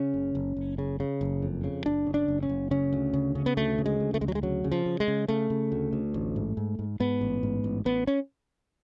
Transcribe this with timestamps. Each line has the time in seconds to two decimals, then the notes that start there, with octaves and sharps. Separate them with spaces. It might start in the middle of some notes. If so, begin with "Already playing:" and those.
Already playing: C#3 C#4
0.14 F#1
0.35 F#1
0.57 F#1
0.78 C#3
1.00 C#3
1.21 F#1
1.42 F2
1.64 C#3
1.85 F#1 D4
2.07 C#3
2.14 D4
2.28 F#1
2.43 C#4
2.49 F#1
2.71 C#3 C#4
2.93 D2
3.13 C#3
3.35 C#3
3.46 B3
3.57 D2 A3
3.78 C#3
3.86 G#3
4.00 D2
4.14 A3
4.21 D2 G#3
4.28 F#3
4.35 G#3
4.43 C#3 F#3
4.64 C#3
4.72 F3
4.86 C#3
5.00 G#3
5.08 C#3
5.28 C#3 A3
5.50 C#3
5.72 D2
5.93 D2
6.14 A1
6.36 G#2
6.57 G#2
6.79 G#2
7.00 G#2 B3
7.21 A1
7.43 G#2
7.64 A1
7.85 A1 B3
8.07 C#4